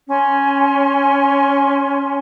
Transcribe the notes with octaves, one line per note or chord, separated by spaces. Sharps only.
C#4 G#5 C6